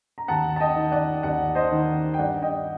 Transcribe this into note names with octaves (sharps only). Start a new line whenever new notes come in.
A#5
D#2 F#5 A5
A5
D#5 G5
D#3
D5 F#5
D#2 D5 F#5
C5 D#5
D#3
G5
G2 D5 F#5
D#5 G5